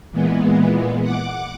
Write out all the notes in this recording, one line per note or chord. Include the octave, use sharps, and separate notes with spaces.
A#2 E3 G#3 B3
F#5 D6